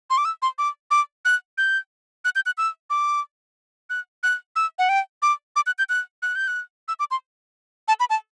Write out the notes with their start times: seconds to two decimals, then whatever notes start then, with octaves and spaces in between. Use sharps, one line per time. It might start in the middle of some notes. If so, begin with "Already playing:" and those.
0.10 C6
0.18 D6
0.25 E6
0.42 C6
0.58 D6
0.91 D6
1.25 F#6
1.58 G6
2.25 F#6
2.35 G6
2.46 F#6
2.58 E6
2.90 D6
3.90 F#6
4.23 F#6
4.56 E6
4.79 F#5
4.89 G5
5.22 D6
5.56 D6
5.66 F#6
5.79 G6
5.89 F#6
6.22 F#6
6.35 G6
6.48 F#6
6.88 E6
6.99 D6
7.11 C6
7.88 A5
8.00 B5
8.10 A5